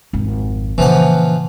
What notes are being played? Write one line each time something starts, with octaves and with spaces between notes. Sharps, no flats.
G#1 F2
A#2 C#3 E3 F3 F#5